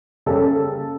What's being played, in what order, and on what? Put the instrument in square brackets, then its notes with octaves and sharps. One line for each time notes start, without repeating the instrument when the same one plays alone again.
[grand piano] C#3 G3 A#3 C#4 [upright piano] A4